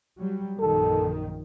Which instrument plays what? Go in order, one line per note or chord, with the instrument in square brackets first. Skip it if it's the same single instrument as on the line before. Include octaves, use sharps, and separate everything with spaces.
[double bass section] F#3 G3
[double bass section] A#1 F#2 D#3 [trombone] A4